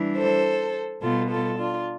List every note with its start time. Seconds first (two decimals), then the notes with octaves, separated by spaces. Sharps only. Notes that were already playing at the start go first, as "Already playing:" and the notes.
Already playing: E3 G3 D4
0.16 A4 C5
1.01 B2 G3 B3 F4 A4
1.29 F4 A4
1.57 D4 F4